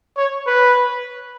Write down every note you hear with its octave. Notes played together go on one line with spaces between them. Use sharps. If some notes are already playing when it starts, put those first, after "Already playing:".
C#5
B4